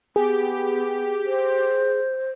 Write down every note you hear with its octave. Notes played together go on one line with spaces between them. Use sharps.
B3 G4 G#4
C5